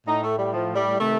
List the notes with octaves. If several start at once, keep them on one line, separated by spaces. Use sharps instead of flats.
A2 D#4
A3
G3
F3
G3
C3 D#3 A3